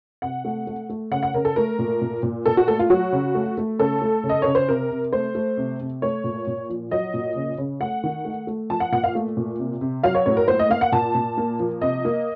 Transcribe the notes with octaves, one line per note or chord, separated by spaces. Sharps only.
C3 F#5
A3
A3
A3
C#3 F#5
F#5
C#3 A#4
A4
A3 A#4
A#2
A#2
A#2
A#2 A4
F#4
A3 A4
F4
F#3 F#4
C#3
A3
A3
C#3 A4
A3
C#3
D#5
C#3 C#5
C5
C3 A#4
C3
A3 C5
A3
C3
C3
A3 C#5
A#2
A#2
F3
F#3 D#5
A#2
C#3
C#3
A3 F#5
D#3
A3
A3
F3 A5
F#5
A#2 F#5
F5
A3
A#2
C3
C3
F#3 F5
C#5
A2 C#5
A#4
A#3 C5
D#5
A#3 F5
F#5
A#2 A5
A#2
A#3
F3
C3 D#5
A#3